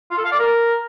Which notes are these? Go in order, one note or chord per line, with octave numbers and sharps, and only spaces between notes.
F4
A4
F5
D5
A#4